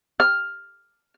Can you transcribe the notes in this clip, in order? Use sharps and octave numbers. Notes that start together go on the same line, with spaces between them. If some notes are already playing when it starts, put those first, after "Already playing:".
F6